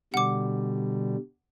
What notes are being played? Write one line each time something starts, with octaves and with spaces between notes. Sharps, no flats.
B2 D3 G3 F#5 D6